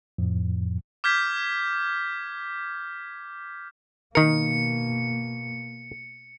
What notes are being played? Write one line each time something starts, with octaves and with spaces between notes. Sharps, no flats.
F2 A2 F3
D6 F6 G6 G#6 B6
B2 D#3 A#3 A#4 C#7